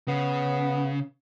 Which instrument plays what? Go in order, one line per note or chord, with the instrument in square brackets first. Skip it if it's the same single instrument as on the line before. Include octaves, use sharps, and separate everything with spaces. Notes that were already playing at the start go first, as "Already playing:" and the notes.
[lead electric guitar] C#3 [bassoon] B3